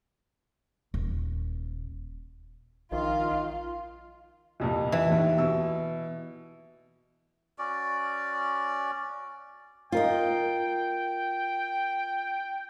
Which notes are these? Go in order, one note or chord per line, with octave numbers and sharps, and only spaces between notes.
D#1
A#1 D#3 F4 F5
C2 F2 A#2
E3 E5
A#1 D#2
B2 E6
C#4 F#4 D5
F4 A#4 D#5 G5